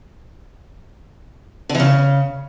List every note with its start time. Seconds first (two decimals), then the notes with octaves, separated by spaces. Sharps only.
1.69 D3
1.75 E3
1.80 C#3